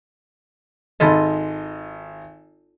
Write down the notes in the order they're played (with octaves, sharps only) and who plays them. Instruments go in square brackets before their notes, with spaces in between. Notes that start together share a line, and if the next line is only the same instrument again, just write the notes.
[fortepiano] G#1 D#5 [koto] E4 F4 A4